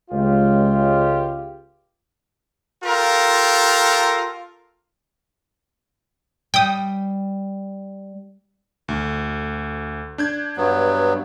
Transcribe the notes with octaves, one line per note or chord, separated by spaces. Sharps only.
C#2 F4 G4
F4 G4 A4 A#4
G3 G5 D#6
D2
D4 G6 G#6
G2 F#3 B3